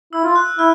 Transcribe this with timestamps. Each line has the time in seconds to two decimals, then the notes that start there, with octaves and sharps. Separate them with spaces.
0.13 E4 E6
0.24 F4
0.36 F#6
0.59 E4 F6